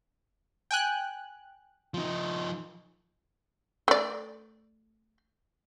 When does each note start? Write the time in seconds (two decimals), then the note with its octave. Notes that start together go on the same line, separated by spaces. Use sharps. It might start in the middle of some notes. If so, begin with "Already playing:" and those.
0.71 G5 G#5 F#6
1.94 F3 D#4
3.88 A3 D5